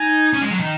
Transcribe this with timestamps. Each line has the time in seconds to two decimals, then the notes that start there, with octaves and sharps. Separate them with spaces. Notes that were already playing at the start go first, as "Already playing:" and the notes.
Already playing: D#4 G#5
0.33 C#4
0.42 G#3
0.50 F#3
0.60 D#3